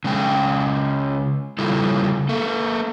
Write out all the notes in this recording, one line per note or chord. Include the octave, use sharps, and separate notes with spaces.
C#3 G#3 G5
C#3 G3 E4 F4 A4
A#3 A4